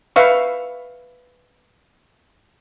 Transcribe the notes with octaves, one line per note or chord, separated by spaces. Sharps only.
B4 E5 F5 C#6